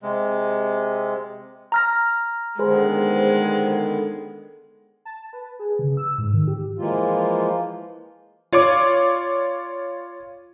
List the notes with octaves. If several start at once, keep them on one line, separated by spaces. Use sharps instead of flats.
C3 G#3
A#5 F6 A#6
D3 D#3 G#3 B3 G#4 B4 C5
A5
B4
G#4
C#3
E6
G#2
D#3
G4
E3 F3 G#3 A#3 F4
F4 C#5 D5 D6